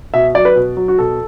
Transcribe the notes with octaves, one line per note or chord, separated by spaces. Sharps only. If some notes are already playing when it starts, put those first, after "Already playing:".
B2 E5
F#3 D5
B4
B2
F#3
F#4
B2 A4